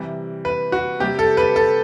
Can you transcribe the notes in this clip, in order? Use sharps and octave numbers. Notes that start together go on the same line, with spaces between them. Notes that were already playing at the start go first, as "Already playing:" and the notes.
Already playing: C3 E3 G3
B4
F#4
C3 G3 G4
A4
B4
A4